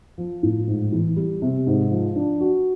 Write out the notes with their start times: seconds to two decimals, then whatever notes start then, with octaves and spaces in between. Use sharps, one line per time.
0.18 F3
0.43 A2
0.68 G#2
0.92 E3
1.16 G3
1.42 C3
1.67 G#2
1.91 F3
2.16 D4
2.41 F#4